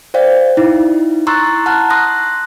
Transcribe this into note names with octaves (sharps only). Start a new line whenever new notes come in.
C5 D5 F5 G5
D#4 E4
A#5 C6 C#6 E6 F#6 A6
F#5 A5 A#5 F6 F#6
C6 D#6 F#6 A#6